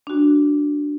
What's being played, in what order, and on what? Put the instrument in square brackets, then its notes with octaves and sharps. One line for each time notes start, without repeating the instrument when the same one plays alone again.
[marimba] D4 F#4